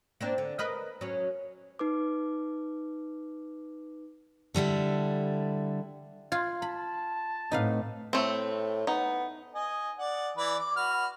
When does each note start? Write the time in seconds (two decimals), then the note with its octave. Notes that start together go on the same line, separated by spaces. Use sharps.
0.21 A#3 C4 D4
0.38 D3
0.59 A#4 B4 D#5
1.01 F#3 C#4
1.79 D#4 B4 D6
4.54 D3 G3 E4 A4
6.32 F4 C6 G#6
6.62 A5 B5
7.51 A2 C4 D#4 B4 D#5 F5
8.13 A2 A3 C4
8.87 B3 D#4
9.55 D#5 G#5
9.99 D5 F#5
10.37 E3 B4 D5
10.59 D6
10.76 F#4 B4 F6